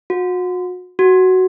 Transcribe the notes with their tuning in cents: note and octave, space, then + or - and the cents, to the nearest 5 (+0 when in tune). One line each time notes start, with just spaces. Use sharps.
F#4 -35
F#4 +10